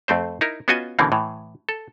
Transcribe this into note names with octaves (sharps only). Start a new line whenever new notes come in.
F2 A3 C4 C5
D#4 E4 A#4
B3 C#4 F4 F#4 D#5 G#5
B2 D3 E3 A#3 C4 C#4
A2 E3
A4